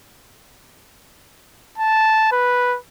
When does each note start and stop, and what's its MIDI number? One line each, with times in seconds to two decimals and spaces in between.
1.78 2.28 81
2.32 2.78 71